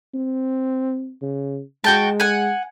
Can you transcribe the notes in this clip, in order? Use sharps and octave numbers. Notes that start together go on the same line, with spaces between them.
C4
C#3
G#3 F#4 G5 A5
F#5 G#5